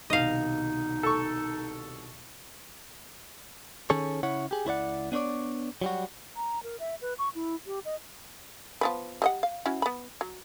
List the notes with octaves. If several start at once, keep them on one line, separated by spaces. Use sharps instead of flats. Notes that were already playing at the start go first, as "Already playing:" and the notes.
C2 B2 D#3 D#4 D#5 F5
A4 C#6
D#3 C#4 G#4 A4 C#5
C#3 E4 C#5 F#5
G4 G#4
C#2 E4 C5 D5 F#5
B3 D4 B4 C#5 D5
F#3 G3 F#4
A#5
A#4
E5
B4
C#6
E4
G4
D#5
F3 B3 B4
G3 D#5 F#5
F5
C#4 E4 F#4
B3 B5
F#3